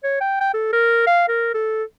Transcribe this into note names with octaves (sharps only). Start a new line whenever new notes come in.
C#5
G5
G5
A4
A#4
F5
A#4
A4